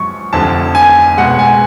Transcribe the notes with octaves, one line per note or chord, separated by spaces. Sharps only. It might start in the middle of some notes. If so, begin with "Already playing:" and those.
Already playing: F#2 F3 G#3 C#6
F1 F2 D3 F3 A5
G#5
C#2 B2 G#3 F#5
G#5